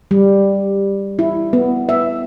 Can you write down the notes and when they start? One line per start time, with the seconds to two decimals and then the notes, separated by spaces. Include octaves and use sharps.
0.11 G3
1.19 E4
1.53 B3
1.89 E5